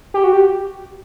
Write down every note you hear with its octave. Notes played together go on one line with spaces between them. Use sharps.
G4
F#4
G4